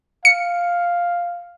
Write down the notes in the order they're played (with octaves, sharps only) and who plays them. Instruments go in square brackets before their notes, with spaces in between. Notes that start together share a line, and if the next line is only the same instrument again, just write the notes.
[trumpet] F5 [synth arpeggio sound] C#7